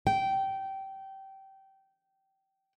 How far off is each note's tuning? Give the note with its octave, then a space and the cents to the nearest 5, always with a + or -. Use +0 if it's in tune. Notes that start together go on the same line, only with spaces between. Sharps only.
G5 -20